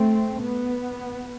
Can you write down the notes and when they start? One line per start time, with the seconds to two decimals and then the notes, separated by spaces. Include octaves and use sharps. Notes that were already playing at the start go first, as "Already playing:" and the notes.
Already playing: A3 C4
0.42 B3